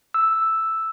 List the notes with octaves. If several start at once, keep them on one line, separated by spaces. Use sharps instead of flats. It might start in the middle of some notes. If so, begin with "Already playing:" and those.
E6